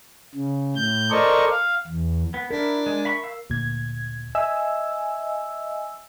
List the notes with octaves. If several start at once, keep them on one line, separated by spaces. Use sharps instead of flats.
C#3
A2 G6
A4 A#4 C5 D5 D#5 C#6
F5
E2
B3
D4 E4 A#4
G#3
E5 B5 C#6
F5 E6
D2 A#2 G#6
D#5 E5 G#5 E6